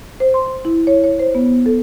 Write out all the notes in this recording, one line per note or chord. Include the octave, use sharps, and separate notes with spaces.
C5
C6
E4
C#5
C#5
C5
B3
A4